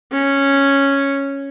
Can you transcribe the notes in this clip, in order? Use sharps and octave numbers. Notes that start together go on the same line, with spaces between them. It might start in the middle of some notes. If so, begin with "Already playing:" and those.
C#4